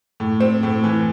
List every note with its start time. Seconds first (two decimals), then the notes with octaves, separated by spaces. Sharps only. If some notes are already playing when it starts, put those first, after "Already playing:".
0.20 A2
0.40 C4
0.63 A2
0.84 E3